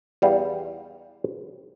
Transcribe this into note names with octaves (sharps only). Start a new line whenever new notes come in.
E2 G3 F5